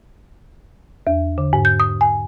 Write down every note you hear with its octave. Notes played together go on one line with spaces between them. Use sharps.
E2
D3
G#2
G6
D#6
G#5